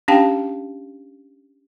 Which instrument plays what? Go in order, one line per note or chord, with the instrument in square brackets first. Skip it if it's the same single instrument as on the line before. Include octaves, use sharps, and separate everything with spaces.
[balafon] C#4 D4 G4 F5 G5 A5